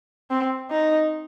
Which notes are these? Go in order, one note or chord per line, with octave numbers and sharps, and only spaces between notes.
C4
D#4